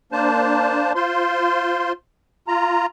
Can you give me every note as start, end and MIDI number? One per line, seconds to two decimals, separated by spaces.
0.12 0.93 58
0.12 0.93 62
0.12 0.93 72
0.12 0.93 81
0.95 1.92 65
0.95 1.92 72
0.95 1.92 84
2.48 2.86 65
2.48 2.86 82